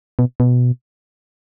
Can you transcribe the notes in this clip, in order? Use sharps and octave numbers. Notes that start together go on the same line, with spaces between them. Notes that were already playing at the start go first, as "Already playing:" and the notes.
B2
B2